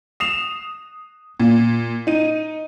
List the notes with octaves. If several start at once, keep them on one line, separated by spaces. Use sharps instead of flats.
D#6 C7 E7 F7
A#2
D#4 D#7